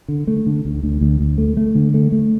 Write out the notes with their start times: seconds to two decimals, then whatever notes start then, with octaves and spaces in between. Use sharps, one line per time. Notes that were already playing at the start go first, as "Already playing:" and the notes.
0.08 D3
0.27 A3
0.46 D3
0.65 D2
0.83 D2
1.01 D2
1.21 D2
1.38 A3
1.57 A3
1.75 D3
1.94 A3
2.12 A3